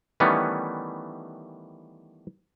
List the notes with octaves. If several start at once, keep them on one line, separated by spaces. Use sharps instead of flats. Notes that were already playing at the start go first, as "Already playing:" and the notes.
D#3 E3 G3 A3 B3 C#4